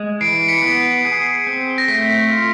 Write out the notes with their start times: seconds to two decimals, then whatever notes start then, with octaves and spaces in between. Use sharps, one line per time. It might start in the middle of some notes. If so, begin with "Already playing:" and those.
Already playing: G#3
0.21 E3 C7 D7
0.48 B6 C#7
0.62 B3
1.05 G#4
1.47 C4
1.78 A#6
1.88 A3 B6
2.30 F4